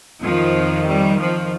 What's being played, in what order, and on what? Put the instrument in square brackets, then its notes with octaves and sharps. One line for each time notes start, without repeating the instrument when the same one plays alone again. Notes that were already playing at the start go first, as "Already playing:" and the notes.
[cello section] F2 D#3 F3
G3
F3